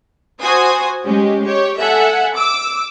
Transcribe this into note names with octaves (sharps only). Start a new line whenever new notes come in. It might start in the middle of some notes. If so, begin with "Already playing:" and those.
F#4 C5 G#5 D#6
G#3 C#4 G4
G4 C#5
A4 E5 F#5 G#5
D6 E6